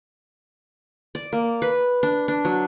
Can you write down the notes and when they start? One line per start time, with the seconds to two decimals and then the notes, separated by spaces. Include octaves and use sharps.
1.15 D5
1.32 A#3
1.62 B4
2.03 D4
2.28 D4
2.45 F#3